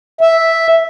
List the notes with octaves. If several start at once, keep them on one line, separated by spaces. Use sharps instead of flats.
E5